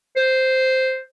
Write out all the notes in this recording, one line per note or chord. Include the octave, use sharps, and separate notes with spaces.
C5